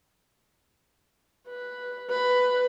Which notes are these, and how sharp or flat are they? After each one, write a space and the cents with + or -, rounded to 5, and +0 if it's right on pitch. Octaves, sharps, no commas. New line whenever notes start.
B4 +0
B4 +10